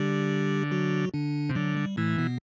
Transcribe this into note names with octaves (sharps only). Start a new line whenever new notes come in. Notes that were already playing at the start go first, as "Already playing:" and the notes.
Already playing: D3 G3 G4
F#3 F#4
D3 D4
C3
D3 F#3
G3
A2 E3 A3
B2 B3